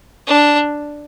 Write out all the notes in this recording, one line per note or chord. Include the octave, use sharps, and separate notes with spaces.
D4